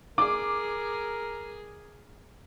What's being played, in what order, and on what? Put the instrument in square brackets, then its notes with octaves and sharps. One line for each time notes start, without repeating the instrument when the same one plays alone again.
[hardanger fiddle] G#4 [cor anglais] A#4 [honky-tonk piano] D6